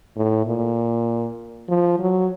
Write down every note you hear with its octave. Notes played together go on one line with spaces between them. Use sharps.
A2
A#2
F3
F#3